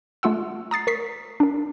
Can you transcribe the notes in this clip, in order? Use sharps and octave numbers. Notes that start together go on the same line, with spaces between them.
G#3 A3 F4 F#5 E6
A#5 D#6 A6 C7
A#4 C#6 B6 C7
D4 A#4